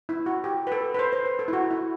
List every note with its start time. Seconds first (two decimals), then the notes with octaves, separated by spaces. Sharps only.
0.09 E4
0.26 F#4
0.44 G4
0.67 B4
0.72 A4
0.94 B4
0.99 C5
1.13 C5
1.26 B4
1.39 A4
1.48 E4
1.53 F#4
1.71 E4